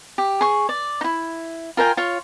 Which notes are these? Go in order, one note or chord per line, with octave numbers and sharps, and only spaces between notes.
G4
G#4 C#6
D5
D#4 E4
F4 A#4 G5 G#5
F4 C#5